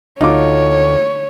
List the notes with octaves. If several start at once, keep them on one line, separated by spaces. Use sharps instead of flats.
D2 D#4 F4 C#5 D6